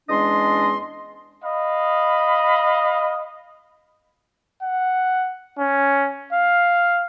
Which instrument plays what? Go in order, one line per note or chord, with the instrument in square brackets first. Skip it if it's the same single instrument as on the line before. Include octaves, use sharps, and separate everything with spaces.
[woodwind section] E2 G#3 C#4 D4 D#5 C6
[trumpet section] D#5 F5 B5
[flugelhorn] F#5
C#4
F5